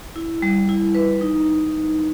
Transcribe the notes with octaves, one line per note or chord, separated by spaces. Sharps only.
E4
G3
E4
B4
D#4